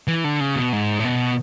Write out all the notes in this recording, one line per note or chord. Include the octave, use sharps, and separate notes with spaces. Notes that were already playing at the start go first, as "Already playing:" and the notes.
E3
D3
C#3
B2
G#2
A2
B2